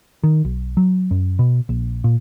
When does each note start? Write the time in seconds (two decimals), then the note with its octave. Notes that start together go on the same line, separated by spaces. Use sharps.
0.23 D#3
0.45 B1
0.77 F#3
1.11 F#2
1.39 B2
1.69 A#1
2.04 A#2